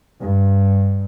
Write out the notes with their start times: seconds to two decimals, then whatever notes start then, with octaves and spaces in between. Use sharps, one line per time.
0.20 G2